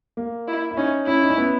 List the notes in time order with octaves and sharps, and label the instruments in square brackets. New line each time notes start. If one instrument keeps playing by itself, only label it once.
[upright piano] A#3
[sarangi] E4
[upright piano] E4
[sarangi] C#4 [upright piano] D#4
[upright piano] C#4 [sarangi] E4
[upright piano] D#4
C#4
B3